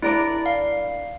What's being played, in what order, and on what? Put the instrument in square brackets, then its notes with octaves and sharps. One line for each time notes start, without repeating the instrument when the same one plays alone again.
[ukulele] D4 A#4 D5 [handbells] E4
[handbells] F5